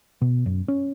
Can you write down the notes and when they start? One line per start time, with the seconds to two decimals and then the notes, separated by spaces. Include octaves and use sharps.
0.21 B2
0.46 F#2
0.68 C#4